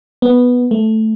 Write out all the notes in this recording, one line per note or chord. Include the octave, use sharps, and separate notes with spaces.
B3
A3